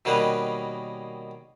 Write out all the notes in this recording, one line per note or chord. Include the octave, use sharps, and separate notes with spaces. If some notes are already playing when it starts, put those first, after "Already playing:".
B2 D#3 G3 A#3 C#4 B4